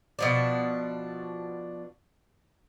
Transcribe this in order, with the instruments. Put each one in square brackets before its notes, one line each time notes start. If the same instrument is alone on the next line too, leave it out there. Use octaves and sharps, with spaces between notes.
[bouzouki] B2 F3 D4